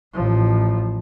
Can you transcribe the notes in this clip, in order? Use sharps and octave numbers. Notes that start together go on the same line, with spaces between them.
A1 F3